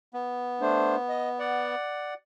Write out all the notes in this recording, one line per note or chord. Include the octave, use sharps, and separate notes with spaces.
B3
A3 D4 C5
D#5
D5 F#5